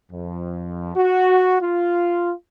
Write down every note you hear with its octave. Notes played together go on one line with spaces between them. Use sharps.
F2
F#4
F4